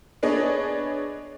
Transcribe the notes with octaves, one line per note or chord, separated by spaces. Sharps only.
B3 D4 G#4 C#5 D#5